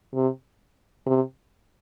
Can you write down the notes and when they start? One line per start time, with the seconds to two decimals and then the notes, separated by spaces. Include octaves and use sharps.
0.14 C3
1.07 C3